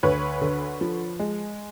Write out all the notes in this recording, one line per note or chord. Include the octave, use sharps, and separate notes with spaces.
D2 B4 C#5
D3
F3
G#3